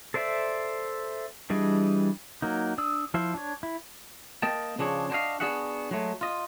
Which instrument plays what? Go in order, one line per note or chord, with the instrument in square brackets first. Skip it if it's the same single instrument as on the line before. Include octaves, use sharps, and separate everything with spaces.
[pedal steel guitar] A4 C5 D5 E5
E3 G3 D4 G#4 D#5
F#3 A#3 D#4
D4 D5 D#6 E6
F3 E4 F4 C5
D4 C#5
E4
[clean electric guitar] A#3 D#5 G5 A5
C#3 F3 D4 G#4 C#5
D4 F#4 C5 D#5 F5
B3 D4 F#4 G#4 E5 F#5
F#3 G#3 A3
F4 D#5